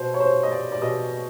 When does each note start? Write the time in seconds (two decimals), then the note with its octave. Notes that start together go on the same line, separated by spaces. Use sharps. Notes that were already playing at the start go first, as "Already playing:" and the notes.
Already playing: B2 C5
0.14 C#5
0.20 C5
0.43 D#5
0.51 D5
0.72 D5
0.82 B2 D#5